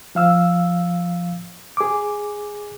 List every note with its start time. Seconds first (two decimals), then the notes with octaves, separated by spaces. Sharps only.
0.15 F3 F5 E6
1.77 G#4 D6